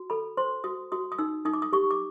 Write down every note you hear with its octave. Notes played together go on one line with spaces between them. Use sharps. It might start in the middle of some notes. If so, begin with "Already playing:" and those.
Already playing: F#4
A4 B5
C5 C6
F#4 D#6
F#4 D#6
D#6
D#4 E6
D#4 D#6
D6
D#6
G4 C#6
D6